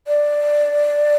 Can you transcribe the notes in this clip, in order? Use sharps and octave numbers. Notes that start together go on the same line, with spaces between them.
D5